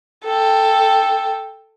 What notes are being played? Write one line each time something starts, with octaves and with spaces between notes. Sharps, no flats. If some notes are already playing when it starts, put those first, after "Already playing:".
A4 G5